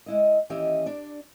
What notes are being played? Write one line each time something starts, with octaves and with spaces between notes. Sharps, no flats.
G#3 E4 D#5
D#2 E3 C#4 G4 D#5 E5
D4 D5